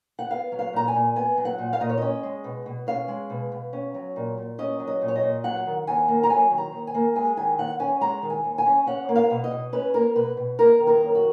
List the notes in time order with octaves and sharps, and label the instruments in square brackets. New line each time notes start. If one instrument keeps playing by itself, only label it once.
[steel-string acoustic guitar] F#5
B3 F5
F#3
F5
A#2 A#5
G#5
A#2
B3 G#5
F#3
F#5
A#2
F5
A#2 D#5
C#5
C#4 D#5
G#3
B2
B2
C#4 F5
G#3
B2
B2
C#4
F#3
A#2
A#2
C#4 D#5
F#3
D#5
A#2
C#5
D#5
A#2
F#3 F#5
D#3
D#2 G#5
A#3
A#5
F#3 G#5
D#3
A#5
D#2
G#5
A#3
G#3 G#5
D#3 G#5
D#2 F#5
C#4 G#5
G#3 A#5
D#3
G#5
D#2
G#5
C#4
C#4 F#5
A#3
F5
B2
D#5
B2
C#4 B4
A#3 A#4
B2 B4
B2
A#3 A#4
D#3
A#4
F#2
F#4